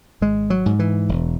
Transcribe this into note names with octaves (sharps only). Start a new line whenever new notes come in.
G#1 G#3
F#3
G#2
E3
E1